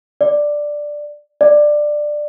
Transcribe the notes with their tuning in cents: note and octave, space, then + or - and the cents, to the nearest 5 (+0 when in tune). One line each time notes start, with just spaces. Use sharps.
D5 +5
D5 +15